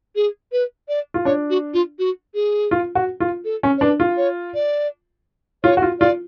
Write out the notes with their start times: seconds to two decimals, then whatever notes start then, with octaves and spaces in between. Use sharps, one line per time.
0.16 G#4
0.52 B4
0.88 D5
1.14 F4
1.25 D4 C#5
1.50 F#4
1.74 F4
1.99 F#4
2.35 G#4
2.71 F4
2.95 F#4
3.20 F4
3.45 A4
3.63 C#4
3.78 C#5
3.81 D4 B4
4.00 F4
4.17 C#5
4.55 D5
5.64 F4 C#5
5.77 F#4
5.82 F4
6.00 F4 D5